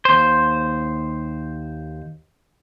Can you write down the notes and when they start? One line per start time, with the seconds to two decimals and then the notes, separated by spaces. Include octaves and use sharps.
0.05 D#2 C5